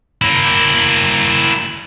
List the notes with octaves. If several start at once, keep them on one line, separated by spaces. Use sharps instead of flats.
A#3 E4